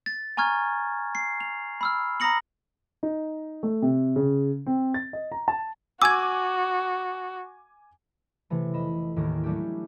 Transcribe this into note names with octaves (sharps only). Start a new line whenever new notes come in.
A6
G#5 A#5 C#6 F6 G#6
C7
F7
B5 E6 F6
A#5 B5 D#6 A#6 C#7 F#7
D#4
A3
C3
C#3
C4
A6
D#5
A#5
A5
F#4 G#5 D6 E6 G#6
C3 E3 A3
F1 D#5 B5 E7
D#2 A2 D#3 C#4 A#4
F#3 G3 A3 C#4 D4 G4